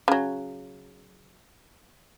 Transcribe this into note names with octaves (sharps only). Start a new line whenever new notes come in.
C#3 F#3